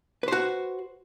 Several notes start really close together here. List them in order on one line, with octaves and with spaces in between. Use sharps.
B4 C5 F#4